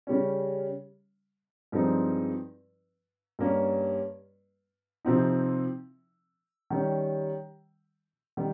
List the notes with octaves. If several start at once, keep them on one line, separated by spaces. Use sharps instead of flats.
C#3 G3 C#4
G2 F3 G#3 C4 D#4
G2 G3 A#3 C#4
C3 F3 C4 D#4
D#3 G3 C#4
D#3 G3